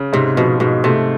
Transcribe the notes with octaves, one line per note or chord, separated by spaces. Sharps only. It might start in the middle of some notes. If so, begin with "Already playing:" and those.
Already playing: C#3
G#2 C3
B2 F3
G#2 B2
C3 A3